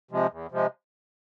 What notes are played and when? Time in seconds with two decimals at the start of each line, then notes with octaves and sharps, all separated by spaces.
0.11 C3 F3 G#3
0.31 E2
0.51 C3 F3 G#3